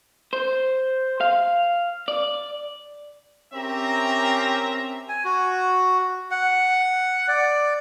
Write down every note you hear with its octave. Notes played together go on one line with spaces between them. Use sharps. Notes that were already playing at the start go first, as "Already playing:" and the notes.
C5
F5
D5
C4 C#4 G4 A#4 E5 A#5
G#5
F#4
F#5
D5